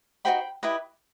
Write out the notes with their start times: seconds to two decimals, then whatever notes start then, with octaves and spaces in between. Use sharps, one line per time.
0.25 D#4 F#4 C5 G5 B5
0.63 E4 G4 B4 D#5